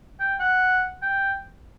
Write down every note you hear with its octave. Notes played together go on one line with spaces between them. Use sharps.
G5
F#5
G5